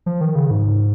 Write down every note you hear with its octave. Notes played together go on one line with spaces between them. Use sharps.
F3
D#3
C#3
G#2